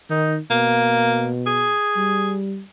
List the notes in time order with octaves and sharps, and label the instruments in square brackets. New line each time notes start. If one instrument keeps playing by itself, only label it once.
[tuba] D#3 [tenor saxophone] D#4
[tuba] B2 [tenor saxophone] A#3
[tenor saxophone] G#4
[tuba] G3